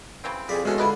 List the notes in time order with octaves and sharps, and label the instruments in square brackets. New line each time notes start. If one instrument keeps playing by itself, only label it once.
[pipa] C#3 E3 C4
[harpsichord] F2 D5 B5 [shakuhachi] G#4
[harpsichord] E2 C#4 [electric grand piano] G#3 A4 [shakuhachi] F#4
[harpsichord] D3 F4 [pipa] E4 B4 D#5